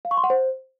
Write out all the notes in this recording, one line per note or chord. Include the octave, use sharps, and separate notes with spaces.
F5
C#6
C6
F#5
C5